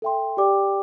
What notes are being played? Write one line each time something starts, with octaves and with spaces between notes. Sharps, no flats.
A4 E5 G5 C6
G4 D5 G5 D6